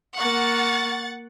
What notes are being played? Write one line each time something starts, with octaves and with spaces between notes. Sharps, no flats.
A#3 F#5 C#6 A6